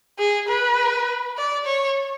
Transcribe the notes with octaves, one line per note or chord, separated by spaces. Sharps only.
G#4
B4
D5
C#5